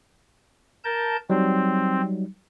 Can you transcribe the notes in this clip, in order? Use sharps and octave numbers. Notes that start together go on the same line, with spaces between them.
A#4 A5 G6
F#3 G3 C4 D#4